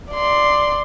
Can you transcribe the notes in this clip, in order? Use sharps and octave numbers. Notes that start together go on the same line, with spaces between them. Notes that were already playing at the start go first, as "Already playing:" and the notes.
D5 C6